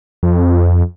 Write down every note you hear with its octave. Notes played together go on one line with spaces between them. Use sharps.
F2